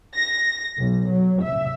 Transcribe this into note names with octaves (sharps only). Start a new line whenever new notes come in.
A#6
B1
F#3
E5